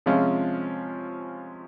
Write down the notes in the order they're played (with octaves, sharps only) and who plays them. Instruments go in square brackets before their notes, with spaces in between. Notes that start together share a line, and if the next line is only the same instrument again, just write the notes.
[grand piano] C3 F3 G#3 C#4 F4